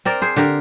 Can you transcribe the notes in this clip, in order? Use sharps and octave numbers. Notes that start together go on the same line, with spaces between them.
C4 A#4 D5
G#4 C5
D3 G4 A#4